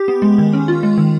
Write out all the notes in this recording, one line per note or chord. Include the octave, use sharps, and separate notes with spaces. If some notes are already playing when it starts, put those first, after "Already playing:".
Already playing: G4
B3
G#3
D#3
C#4
F4
G#3
D#3